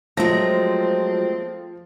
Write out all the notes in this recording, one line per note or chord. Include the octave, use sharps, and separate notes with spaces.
F3 F#3 G#3 A3 C4 A#6